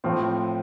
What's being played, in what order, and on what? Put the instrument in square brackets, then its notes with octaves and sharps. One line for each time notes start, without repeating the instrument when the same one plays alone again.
[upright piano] A2 F3 C4